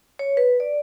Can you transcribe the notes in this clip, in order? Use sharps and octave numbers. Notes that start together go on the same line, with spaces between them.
C#5
B4
D5